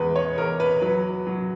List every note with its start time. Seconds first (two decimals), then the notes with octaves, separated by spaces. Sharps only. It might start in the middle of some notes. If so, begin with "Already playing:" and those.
Already playing: E2 G#3 B4
0.16 C#5
0.38 E2 A#4
0.60 B4
0.82 F#3 B4
1.27 F#3